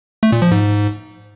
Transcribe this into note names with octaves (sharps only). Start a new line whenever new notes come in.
A3
A#2
F3
G#2